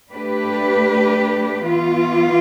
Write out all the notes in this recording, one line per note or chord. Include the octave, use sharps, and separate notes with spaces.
A3 D4 G4 B4
E3 B3 F4